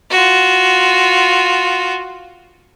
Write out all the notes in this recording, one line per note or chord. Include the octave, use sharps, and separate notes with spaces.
F4 F#4